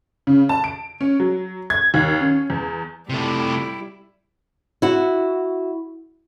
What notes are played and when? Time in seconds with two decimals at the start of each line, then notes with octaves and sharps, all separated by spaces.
0.27 C#3
0.49 A5
0.64 D7
1.01 C#4
1.20 F#3
1.70 G#6
1.94 D#2
2.21 C#4
2.50 E2
3.09 C3 G3 A3 E4
4.82 E4 F#4